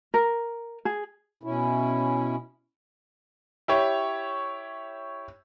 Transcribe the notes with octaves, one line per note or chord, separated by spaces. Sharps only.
A#4
G#4
B2 C#4 E4
E4 G4 C#5